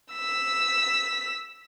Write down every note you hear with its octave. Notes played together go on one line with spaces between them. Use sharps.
E6 B6